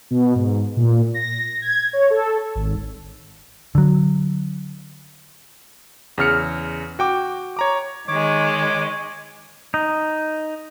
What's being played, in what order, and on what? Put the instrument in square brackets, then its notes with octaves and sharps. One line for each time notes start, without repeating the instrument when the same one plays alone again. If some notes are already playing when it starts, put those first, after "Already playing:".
[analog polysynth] B2
G#2
A#2
A#6
G#6
C#5
A4
G#1
[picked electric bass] D3 F#3
[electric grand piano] E2 C#3 F6 C#7
F#4 G5 D6
C#5 A#5 D6
[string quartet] D#3 G#3 [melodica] C#5 D6
[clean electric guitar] D#4